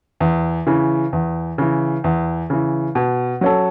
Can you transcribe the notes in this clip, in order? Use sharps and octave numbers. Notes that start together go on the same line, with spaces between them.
E2
C#3 E3
E2
C#3 E3
E2
C#3 E3
B2
F#3 C#4 A4